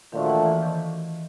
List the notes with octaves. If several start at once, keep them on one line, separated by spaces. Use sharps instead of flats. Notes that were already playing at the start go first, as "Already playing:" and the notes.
A#2 D#3 F3 A3 D4 F#4
E3
E3
D#3